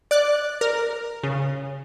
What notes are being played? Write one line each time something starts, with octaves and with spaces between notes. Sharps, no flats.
D5 F#6
A#4
C#3